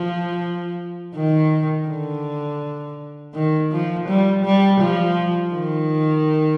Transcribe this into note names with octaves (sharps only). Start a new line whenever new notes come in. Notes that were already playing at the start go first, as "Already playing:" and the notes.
Already playing: F3
D#3
D3
D#3
F3
G3
G3
F3
D#3